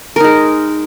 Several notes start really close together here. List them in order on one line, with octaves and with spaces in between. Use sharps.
A#4 D#4 G#3